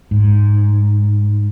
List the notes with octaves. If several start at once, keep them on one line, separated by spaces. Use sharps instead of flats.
G#2